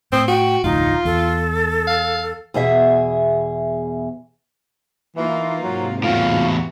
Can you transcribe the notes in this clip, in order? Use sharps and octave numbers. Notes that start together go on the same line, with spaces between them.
A2 C4 D#6
F#4 G5
F1 D2 A2 D#4 F4
E2 A4
F5
E2 B2 G#4 E5
E3 A#3 D#4 F4
G#2 C3 F#3
E2 A2 E3 F4 F#4